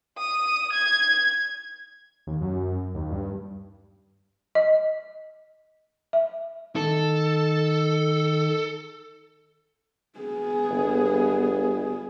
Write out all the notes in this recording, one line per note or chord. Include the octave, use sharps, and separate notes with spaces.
D#6
G#6
D#2
F#2
D#2
G2
D#5
E5
D#3 A4
B3 G#4
G1